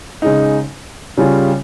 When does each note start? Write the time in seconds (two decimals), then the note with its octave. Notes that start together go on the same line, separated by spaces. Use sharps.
0.22 C#3 G#3 D#4
1.17 C#3 G3 C#4 F4